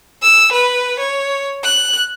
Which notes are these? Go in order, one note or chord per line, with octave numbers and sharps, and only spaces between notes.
E6
B4
C#5
F#6